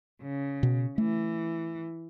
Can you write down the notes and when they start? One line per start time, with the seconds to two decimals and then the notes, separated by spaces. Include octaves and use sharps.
0.21 C#3
0.63 B2
0.98 E3 A3